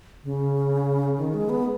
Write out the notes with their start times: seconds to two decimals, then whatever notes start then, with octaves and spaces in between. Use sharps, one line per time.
0.24 C#3
1.18 D#3
1.34 G#3
1.49 B3